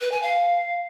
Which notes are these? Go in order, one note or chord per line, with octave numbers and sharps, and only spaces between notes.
B4
G#5
F5